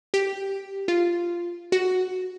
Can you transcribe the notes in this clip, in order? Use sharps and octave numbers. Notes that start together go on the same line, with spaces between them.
G4
F4
F#4